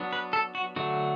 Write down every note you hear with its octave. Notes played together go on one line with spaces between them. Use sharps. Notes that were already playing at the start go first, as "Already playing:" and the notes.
Already playing: F#3 B3 D4
B4
A4
F#4
D3 F#3 A3 F#4